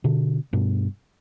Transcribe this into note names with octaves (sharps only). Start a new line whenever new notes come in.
B2 D3
G2 B2